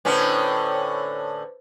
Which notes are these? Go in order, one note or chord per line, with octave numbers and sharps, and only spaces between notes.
A2 D3 C#4 B4 C5